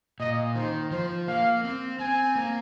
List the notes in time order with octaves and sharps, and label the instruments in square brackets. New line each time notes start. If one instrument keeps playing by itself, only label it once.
[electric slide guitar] A#2 [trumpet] D#5
[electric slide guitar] D#3 [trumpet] C5
[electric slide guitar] F3 [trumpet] C5
[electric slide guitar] A#3 [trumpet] F5
[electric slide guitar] C4
[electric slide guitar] C4 [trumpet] G#5
[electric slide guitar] A#3